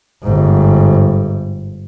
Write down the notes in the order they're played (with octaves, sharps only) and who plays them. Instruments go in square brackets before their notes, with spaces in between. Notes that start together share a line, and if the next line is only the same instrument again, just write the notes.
[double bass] G1 G#2